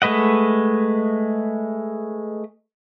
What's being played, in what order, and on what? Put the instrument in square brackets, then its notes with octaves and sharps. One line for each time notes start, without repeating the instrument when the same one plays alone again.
[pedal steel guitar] G#3 A3 B4 D#5 F#5